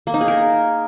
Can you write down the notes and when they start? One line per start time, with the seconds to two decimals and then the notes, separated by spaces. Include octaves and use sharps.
0.07 A#3
0.14 D#4
0.21 G#4
0.28 A#4